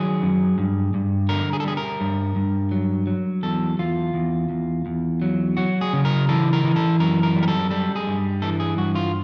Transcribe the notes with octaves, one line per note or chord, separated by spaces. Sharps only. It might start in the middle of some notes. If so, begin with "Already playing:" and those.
Already playing: D#3 F#3 G#4
F#2
G2
G2
D3 A#4
G#4
A4
G3 G#4
A#4
G2
G2
F#3
F#3
E2 A4
E2 F4
E2
E2
E2
F#3
F#3 F#4
G#4
C#3
A#4
E3 A4
A#4
E3
A4
F#2 A#4
A#4
G3
A#4
A4
G3 A4
G#4
G2
E3 A4
A4
G#4
G2 F#4
F4